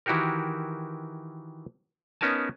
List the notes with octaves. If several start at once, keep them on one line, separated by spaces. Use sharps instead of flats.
D#3 E3 E4 F#4 G4 A#4
B3 C#4 D#4 A#4 G#5 A5